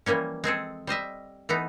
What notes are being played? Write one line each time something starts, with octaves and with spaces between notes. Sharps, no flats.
E3 F3 G3 A#3 C#4
G#3 C4 G#4 A4
G3 C5 D#5 E5
E3 A3 B3 D#4